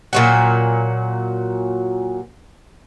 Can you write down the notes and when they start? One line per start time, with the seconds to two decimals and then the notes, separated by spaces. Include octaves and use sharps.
0.13 A#2 F#3 F#4